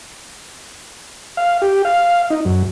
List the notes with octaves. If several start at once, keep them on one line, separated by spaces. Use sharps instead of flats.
F5
G4
F5
D#4
F#2